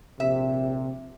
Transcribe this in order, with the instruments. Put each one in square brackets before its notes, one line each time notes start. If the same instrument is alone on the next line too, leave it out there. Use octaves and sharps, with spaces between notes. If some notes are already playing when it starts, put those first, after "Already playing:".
[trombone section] A#1 C3 [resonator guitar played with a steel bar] E5